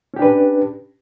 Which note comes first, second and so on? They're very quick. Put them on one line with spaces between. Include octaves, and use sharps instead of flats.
C#4 G4 D4 B4